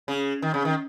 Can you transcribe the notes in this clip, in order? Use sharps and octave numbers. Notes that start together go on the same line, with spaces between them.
C#3
D#3
C#3
D#3